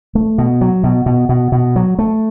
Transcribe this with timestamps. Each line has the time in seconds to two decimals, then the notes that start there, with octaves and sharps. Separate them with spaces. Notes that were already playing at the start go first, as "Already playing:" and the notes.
0.15 A3
0.38 B2
0.61 F#3
0.84 B2
1.06 B2
1.29 B2
1.52 B2
1.76 F#3
1.99 A3